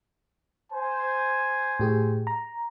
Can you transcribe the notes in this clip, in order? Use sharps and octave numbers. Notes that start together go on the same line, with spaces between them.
C5 G#5
A2 G4 G#4
A#5